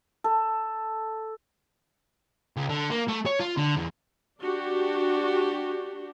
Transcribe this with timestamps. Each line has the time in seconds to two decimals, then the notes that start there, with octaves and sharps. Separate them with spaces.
0.24 A4
2.56 C#2
2.69 D3
2.90 A#3
3.08 A3
3.26 C#5
3.40 F4
3.57 D3
3.76 E2
4.41 D4 F#4 G4